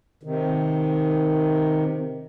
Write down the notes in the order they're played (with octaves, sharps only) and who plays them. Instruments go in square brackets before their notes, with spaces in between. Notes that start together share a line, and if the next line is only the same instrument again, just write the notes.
[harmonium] C3 D#3